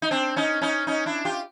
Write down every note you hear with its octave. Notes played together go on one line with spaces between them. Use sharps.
D#4
C4 D4
C#4 D#4
C#4 D#4
C#4 D#4
D4 E4
F4 G4